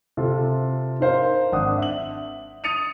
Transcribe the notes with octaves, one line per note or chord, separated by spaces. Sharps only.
C3 F4 A4
D#4 A#4 C5 F5
G#1 D4 F#5 D#6
E5 F#7
D#6 A6 C#7 D#7 F7